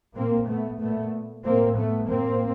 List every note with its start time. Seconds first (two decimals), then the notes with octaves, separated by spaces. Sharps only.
0.16 A#2 A#3 C4
0.48 A3 B3
0.80 A#2 A3 B3
1.44 A2 A#3 C4
1.76 A3 B3
2.08 A2 A#3 C4